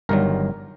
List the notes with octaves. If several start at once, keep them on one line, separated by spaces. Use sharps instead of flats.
G1 G2 D#3 F#3 A#4